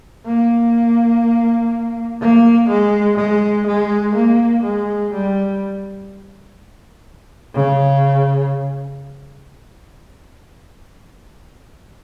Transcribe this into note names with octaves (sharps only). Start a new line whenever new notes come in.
A#3
A#3
G#3
G#3
G#3
A#3
G#3
G3
C#3